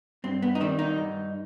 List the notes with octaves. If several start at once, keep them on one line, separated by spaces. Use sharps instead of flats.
G2 C4
B3
D#4
D#3 G3 C4
D#4
G2